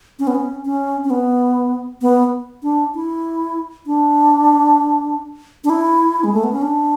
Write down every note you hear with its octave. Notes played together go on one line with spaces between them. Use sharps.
C#4
B3
C#4
C#4
C#4
B3
B3
D4
E4
D4
D4
E4
G#3
A3
B3
C#4
D4